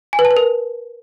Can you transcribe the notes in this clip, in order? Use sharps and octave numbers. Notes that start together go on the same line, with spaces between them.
G#5
B4
A5
B4
A#4